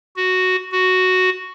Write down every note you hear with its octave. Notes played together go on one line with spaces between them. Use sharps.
F#4
F#4